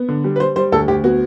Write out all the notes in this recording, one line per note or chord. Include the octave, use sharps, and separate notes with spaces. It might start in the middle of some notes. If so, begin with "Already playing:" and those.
Already playing: B3
D3
G3
B4
G3 C5
G3 C5
D2 A4
D2 G4
B3 F#4